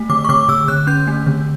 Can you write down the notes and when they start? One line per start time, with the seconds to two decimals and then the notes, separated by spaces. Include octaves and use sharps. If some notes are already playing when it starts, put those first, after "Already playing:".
Already playing: A3
0.10 D3 D6
0.25 C#6
0.29 D3 D6
0.49 D3 E6
0.68 D3 F#6
0.87 C#4 G6
1.07 A3
1.26 D3